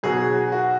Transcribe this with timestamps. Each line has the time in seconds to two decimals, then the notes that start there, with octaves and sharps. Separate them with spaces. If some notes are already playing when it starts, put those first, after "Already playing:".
0.03 B1 B2 F#3 G#4
0.52 F#4